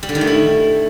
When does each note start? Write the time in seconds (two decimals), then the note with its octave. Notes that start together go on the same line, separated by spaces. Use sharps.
0.03 G3
0.09 D3
0.15 D#3
0.21 A3
0.27 E4